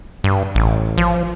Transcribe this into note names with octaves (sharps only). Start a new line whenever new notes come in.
G2
A1
F3